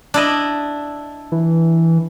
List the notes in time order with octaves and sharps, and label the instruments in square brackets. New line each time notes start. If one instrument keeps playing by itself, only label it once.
[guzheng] D4 E4 D#5
[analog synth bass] E3